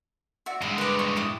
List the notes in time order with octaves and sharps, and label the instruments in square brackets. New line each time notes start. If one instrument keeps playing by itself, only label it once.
[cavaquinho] F#4 D5 E5
[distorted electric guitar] G2 G#3 [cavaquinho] E5
[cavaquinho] B4 D6
C#6
E4 D6 D#6